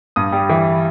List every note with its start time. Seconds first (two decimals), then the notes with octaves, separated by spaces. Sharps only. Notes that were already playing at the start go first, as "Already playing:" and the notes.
0.16 G2 D#6
0.32 G3
0.49 E3